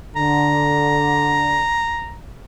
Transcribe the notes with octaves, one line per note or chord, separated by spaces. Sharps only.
D3 A#5